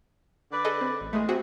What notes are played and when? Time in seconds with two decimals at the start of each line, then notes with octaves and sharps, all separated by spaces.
0.52 D3 B4 D5
0.65 G#4 A4 D#5
0.81 C4
1.01 A1
1.13 E2 G#3 A3 G#4
1.29 C3 C4 F#4 G#4